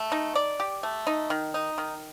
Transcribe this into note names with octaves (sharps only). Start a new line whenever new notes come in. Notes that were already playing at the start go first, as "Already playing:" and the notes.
Already playing: A3
D#4
D5
G4
A3
D#4
D#3
D#4
D#3